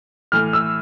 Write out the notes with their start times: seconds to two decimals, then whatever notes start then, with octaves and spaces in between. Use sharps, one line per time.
0.32 A2 E3 F6
0.53 E6